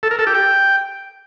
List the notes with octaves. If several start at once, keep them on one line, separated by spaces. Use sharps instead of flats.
A4
A#4
A4
G4
G5